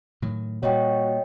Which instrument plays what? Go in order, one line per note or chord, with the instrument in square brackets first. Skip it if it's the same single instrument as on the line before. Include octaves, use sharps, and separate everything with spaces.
[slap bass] A2 D#3 F#3
[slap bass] A#2 G3 [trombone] F#4 [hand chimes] C#5 D#5 G5